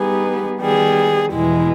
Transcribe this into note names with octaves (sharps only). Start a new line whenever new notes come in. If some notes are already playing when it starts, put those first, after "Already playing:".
Already playing: G3 B3 D#4 G4 G#4 B4
D#3 G3 B3 G#4
E2 B2 G#3 E4